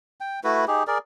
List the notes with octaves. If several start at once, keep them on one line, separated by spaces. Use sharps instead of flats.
G5
A3 E4 F#4 B4
D#4 G4 G#4
G#4 A#4 D5